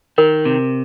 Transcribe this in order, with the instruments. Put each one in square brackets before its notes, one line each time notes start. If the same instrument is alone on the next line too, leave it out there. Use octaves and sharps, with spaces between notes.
[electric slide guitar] D#3 [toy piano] A#4
[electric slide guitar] C3